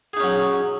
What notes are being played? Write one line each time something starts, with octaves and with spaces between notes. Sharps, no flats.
F#3 C#4 D#4 G#4